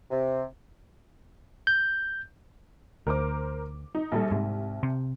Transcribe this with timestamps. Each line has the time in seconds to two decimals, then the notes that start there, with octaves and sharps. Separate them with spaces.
0.10 C3
1.67 G6
3.07 D2 A#4 C5 D6
3.95 D#4
4.12 A#1 G3 A4
4.31 C2 G#2
4.83 C3